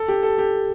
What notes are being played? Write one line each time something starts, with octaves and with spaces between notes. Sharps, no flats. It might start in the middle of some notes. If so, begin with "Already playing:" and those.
Already playing: A4
G4
A4
G4